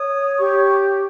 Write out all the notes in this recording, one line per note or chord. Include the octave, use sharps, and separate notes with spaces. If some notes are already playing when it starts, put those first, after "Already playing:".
Already playing: C#5 D#6
G4 C#6